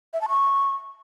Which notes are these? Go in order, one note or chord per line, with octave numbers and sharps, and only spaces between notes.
E5
A5
C#6